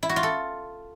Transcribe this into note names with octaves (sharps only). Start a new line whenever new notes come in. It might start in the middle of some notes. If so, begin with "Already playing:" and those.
E4
F#4
F4
A4